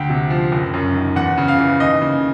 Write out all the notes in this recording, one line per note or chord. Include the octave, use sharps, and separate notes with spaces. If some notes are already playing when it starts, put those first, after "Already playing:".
Already playing: D2 G5
C3
F3
F#1
F#2
D#3
E2 F#5
C#3
F5
E3
D#2 D#5
C#3